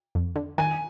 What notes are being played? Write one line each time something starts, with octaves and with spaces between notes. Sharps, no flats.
F2
D3
D#3 G#5